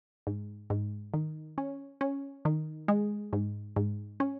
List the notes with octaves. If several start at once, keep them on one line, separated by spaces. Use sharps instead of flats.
G#2
G#2
D#3
C#4
C#4
D#3
G#3
G#2
G#2
C#4